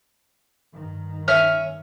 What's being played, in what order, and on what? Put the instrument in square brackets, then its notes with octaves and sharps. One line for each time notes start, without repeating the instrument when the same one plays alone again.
[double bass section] G2 D#3
[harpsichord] C#4 E5 G#5 [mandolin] F6